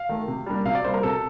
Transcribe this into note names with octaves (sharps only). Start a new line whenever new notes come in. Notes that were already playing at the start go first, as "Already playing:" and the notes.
Already playing: F5
D#3 A3
C3
G3 A#3 D4
C3 F5
D5
G3 A#3 D4 C5
A#4
C3 A4